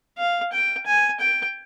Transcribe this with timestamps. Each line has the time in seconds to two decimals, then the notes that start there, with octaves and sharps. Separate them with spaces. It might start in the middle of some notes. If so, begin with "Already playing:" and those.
0.18 F5
0.53 G5
0.86 G#5
1.20 G5